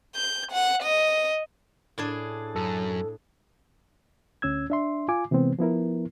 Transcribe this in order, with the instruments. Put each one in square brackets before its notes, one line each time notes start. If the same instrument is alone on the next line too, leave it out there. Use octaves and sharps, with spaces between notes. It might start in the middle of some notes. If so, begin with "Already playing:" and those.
[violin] G6
F#5
D#5
[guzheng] A2 D4 G#4
[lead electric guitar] F#2 [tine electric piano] A4
[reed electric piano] D2 C#4 E6 G#6
D4 E5 C6
F4 G#5 D6
C3 E3 G#3 B3 C4
F3 B3 E4 A#4